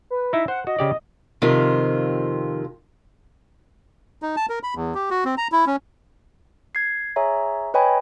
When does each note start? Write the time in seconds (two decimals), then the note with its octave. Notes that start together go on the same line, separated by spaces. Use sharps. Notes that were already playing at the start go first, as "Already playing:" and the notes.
0.10 B4
0.33 D#4 E4 E5
0.48 C5 F#5
0.67 F#4 D#5
0.79 C#3 G4 D5
1.42 F2 C3 D#3 F4
4.22 D#4
4.37 A5
4.49 A#4
4.63 B5
4.75 E2
4.95 G4
5.11 F#4
5.25 C4
5.38 A#5
5.52 E4
5.67 C#4
6.75 G#6 C7
7.16 G#4 C#5 E5 G#5 A#5
7.74 B4 C#5 D#5 G5 G#5 B5